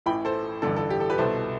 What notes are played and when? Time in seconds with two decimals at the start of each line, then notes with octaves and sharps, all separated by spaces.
0.06 A1 A2 E3 G5 B5
0.25 A4 C5
0.62 A1 G2 D3 A4
0.76 A4
0.90 G4
1.00 A4
1.10 G4 B4
1.18 C2 B2 A4 C5